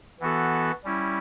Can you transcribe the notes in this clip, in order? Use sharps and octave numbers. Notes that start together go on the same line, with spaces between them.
E3 B3 F#4 A4
G3 C#4 E4